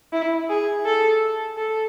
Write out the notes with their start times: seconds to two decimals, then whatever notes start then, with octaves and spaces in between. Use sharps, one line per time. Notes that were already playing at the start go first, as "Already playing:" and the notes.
0.13 E4
0.49 G#4
0.85 A4
1.57 A4